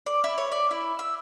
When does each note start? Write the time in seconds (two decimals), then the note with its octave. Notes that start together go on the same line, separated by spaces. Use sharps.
0.06 D5
0.24 E4
0.38 C#5
0.52 D5
0.71 E4
0.99 E6